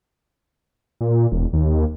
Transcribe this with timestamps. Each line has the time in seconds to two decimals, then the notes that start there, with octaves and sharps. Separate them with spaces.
1.01 A#2
1.32 E1
1.53 D#2